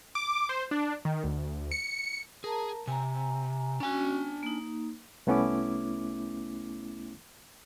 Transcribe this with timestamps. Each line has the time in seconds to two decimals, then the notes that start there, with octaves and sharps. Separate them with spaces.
0.15 D6
0.49 C5
0.71 D4
1.05 D#3
1.24 D2
1.71 C#7
2.44 G#4 A#4 A5 A#5
2.87 C3 G#5 A#5
3.80 C#4 D4 F#4 G#5
4.43 A#3 D#4
5.27 C2 A3 B3 C#4 E4 D6